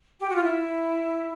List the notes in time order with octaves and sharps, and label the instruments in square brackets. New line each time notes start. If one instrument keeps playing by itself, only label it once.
[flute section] G4
F#4
F4
E4